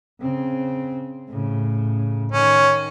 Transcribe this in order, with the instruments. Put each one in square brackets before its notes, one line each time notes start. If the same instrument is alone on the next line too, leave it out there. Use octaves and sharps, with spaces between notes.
[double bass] C#3 C4
A2 C#3
[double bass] D#3 [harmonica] C#4